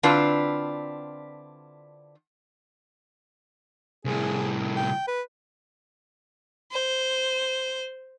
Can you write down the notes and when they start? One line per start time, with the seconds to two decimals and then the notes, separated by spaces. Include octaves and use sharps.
0.03 D3 C4 D4 E4 F4 B4
4.05 C2 A2 G#4
4.76 G5
5.07 B4
6.72 C5